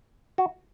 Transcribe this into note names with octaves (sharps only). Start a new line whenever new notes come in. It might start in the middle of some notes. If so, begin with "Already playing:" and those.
F#4